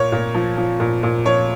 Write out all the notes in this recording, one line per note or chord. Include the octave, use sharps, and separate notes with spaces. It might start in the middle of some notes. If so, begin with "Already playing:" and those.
Already playing: A#2 C#5
A#2
F3
F3
A#2
A#2
F3 C#5